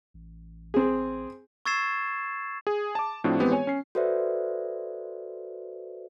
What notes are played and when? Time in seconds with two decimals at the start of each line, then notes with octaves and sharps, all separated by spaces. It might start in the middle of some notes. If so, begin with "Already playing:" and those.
0.14 A1
0.74 C4 G#4
1.65 C#6 E6 G#6 A6 C7 E7
2.67 G#4
2.95 A5 D6
3.24 A2 F3 C4 D4 F#4
3.39 E3 G#3 B3 C4 G4
3.52 C#5 G#5
3.67 C#4 C7
3.95 F#4 A4 B4 C5 D5 E5